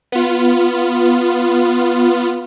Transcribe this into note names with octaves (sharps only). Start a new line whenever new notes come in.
B3 F4